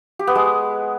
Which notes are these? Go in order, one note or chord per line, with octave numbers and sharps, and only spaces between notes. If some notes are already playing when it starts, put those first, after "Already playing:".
G4
B3
G#3